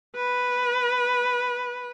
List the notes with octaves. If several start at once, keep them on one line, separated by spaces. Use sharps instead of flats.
B4